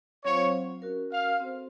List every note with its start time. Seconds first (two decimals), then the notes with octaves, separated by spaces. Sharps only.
0.24 F#3 C4 F4 C5 C#5 F5
0.82 C#4 F#4 A#4
1.11 F5
1.40 C4 F#4 A4 C5